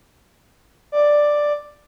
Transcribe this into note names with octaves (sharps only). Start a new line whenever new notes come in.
D5